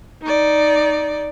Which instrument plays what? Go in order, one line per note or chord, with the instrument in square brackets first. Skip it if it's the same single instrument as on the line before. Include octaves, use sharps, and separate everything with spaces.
[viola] D#4 D5